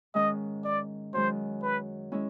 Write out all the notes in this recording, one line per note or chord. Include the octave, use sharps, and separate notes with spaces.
G#2 D#3 G#3 C#4 D#5
D5
F#2 D#3 G#3 C5
B4
G#3 C#4 E4